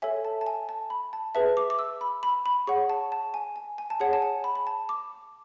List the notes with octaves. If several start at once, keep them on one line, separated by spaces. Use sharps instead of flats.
A4 C#5 E5 G#5
A5
A5
G#5
A5
B5
A5
G#4 B4 E5 A5
D6
D6
E6
B5
B5
B5
G#4 C#5 F#5 C#6
A5
A5
G#5
G#5
G#5
A5
G#4 C#5 F#5 G#5
A5
G#5
B5
B5
A5
D6